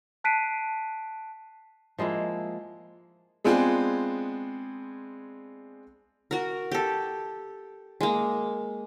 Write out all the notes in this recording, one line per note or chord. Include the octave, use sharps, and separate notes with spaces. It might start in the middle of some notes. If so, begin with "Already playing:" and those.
A5 F#6 B6 C7 D7 D#7
F3 G#3 A#3 E4
G#3 B3 C4 D4 F4 G#4
F#4 A#4
G4 A4
G#3 A#3